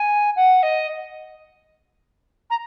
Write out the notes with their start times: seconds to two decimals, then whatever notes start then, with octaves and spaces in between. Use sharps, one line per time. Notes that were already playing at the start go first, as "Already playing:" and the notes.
Already playing: G#5
0.36 F#5
0.62 D#5
2.50 A#5